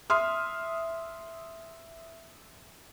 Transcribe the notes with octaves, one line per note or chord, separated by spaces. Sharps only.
E5 C6 D#6 F6